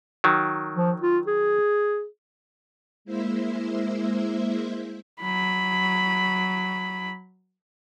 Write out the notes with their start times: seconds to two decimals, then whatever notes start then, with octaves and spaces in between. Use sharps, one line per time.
0.24 D#3 F#3
0.75 F3
1.02 F4
1.27 G#4
3.05 G#3 A#3 E4 C5 E5
5.21 F#3 B5